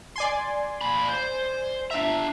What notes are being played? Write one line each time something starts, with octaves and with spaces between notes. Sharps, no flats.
D5 G#5 C6
A#2 B5
C5
D4 E5 A#5